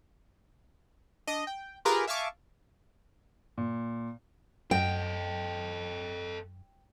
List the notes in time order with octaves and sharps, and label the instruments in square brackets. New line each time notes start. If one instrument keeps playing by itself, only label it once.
[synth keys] D4 D#5
G5
F4 G4 G#4 A#4 B4 F5
E5 F5 G#5 A5 C#6 D6
[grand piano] A#2
[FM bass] F#2 [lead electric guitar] A4 D#5 [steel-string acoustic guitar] G5